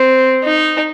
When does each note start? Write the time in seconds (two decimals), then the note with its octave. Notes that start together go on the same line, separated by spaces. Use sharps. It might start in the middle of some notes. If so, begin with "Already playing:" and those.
Already playing: C4
0.44 D#4